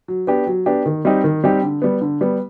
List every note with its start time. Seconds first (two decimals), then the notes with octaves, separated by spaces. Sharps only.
0.08 F#3
0.27 B3 D4 G4
0.47 F#3
0.66 B3 D4 G4
0.86 D#3
1.05 G3 C4 D#4 G4
1.24 D#3
1.44 G3 C4 D#4 G4
1.63 D3
1.82 G3 B3
2.01 D3
2.21 G3 B3